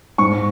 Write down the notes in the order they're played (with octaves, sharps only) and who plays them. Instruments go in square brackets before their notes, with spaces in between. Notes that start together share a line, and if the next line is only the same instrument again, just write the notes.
[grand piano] G#2 C#6